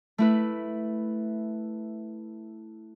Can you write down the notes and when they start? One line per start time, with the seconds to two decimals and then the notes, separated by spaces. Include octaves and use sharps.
0.18 A3 E4 B4